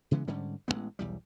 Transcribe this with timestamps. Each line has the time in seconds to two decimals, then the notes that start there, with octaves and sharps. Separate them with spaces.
0.11 C#3 E3 G#3 B3
0.28 G#2 D3 G3 C#4
0.68 A1 D#3 G#3 B3
0.99 B1 E2 G3